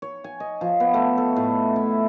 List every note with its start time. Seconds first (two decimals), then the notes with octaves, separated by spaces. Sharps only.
0.02 C#5
0.24 G#5
0.40 D#5
0.61 F3
0.80 B3
0.94 A3
1.18 A4
1.36 A2
1.76 E4